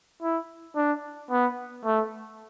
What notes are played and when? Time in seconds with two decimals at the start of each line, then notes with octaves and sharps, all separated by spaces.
0.22 E4
0.76 D4
1.31 B3
1.85 A3